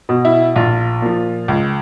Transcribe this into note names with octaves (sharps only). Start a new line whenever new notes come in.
B2
E4
A#1 F4
A#2 F3
C#2